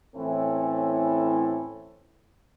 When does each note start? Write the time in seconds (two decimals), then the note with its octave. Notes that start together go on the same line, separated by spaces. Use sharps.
0.15 A2 E3 C4 C#4 E4 A4